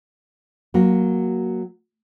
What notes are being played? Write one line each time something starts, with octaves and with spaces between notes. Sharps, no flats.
F#3 A#3 F#4